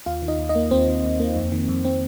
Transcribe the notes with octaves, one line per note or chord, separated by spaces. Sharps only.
D#2 F4 F5
D#3
D#4 D#5
D#2
D#4 D#5
A#3
D#2 C4 C5
D#3
D#2
A#3
F2
D#3
F2
C4